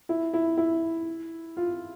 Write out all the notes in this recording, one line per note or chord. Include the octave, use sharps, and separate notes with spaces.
E4
E4
E4
F4